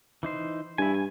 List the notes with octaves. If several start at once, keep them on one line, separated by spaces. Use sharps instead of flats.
E3 D#4 C5
G2 E4 G#5
G#5